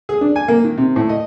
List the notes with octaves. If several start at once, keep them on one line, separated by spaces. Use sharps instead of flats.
G#4
D4
G#5
A#3
D#3
C3
A2
D#5